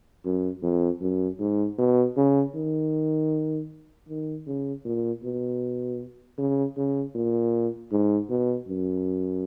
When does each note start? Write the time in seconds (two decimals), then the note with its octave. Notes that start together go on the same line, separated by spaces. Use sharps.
0.25 F#2
0.63 F2
1.02 F#2
1.40 G#2
1.79 B2
2.17 C#3
2.56 D#3
4.09 D#3
4.47 C#3
4.85 A#2
5.24 B2
6.38 C#3
6.77 C#3
7.15 A#2
7.92 G#2
8.30 B2
8.69 F#2